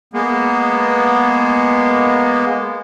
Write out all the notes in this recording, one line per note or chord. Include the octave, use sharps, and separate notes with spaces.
G#3 A#3 B3